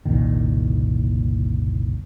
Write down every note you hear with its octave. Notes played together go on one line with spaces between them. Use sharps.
F#1 C2 A#2 D#3